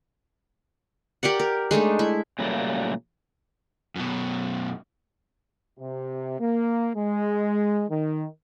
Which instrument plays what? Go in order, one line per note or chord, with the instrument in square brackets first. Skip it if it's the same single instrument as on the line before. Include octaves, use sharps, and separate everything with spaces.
[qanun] G4 A#4 D5 F#5
A#4
G#3 A3 D4 D#4
E4
[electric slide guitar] A#2 C#3 F#3 G3 A3 A#3
[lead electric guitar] F#2 B2
[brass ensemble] C3
A#3
G#3
D#3